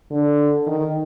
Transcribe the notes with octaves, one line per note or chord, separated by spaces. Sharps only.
D3
D#3